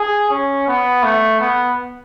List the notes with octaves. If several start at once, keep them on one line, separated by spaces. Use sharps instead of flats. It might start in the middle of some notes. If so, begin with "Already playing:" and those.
Already playing: G#4
C#4
B3
A3
B3